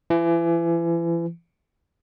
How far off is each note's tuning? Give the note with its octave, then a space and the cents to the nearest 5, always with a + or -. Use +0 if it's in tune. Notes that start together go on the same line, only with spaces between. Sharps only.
E3 +35